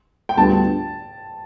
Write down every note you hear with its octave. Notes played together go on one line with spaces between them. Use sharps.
G5
D2 D3 G3 B3 F4 A5